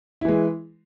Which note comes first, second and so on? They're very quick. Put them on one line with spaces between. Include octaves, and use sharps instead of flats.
E4 E3 G#3